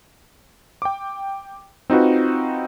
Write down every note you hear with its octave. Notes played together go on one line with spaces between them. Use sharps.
G5 D6
C4 D#4 F4 F#4 B4